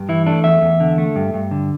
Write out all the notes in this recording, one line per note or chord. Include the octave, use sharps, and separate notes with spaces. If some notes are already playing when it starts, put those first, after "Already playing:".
Already playing: G2
E3 E4
A3 D4
E2 E5
E2
D3
A3
G2
G2
D3